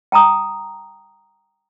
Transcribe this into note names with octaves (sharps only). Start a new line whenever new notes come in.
G5 A5 A#5 D#6